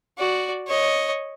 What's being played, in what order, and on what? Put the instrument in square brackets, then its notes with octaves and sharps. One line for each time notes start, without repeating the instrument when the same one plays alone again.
[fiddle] F#4 D5
C#5 D#5